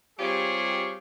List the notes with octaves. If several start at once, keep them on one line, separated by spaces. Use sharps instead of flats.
G3 C4 F4 G4 G#4 C#5